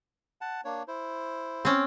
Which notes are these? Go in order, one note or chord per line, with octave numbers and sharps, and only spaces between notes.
F#5 A5
A#3 D4 C#5
E4 C5
C4 C#4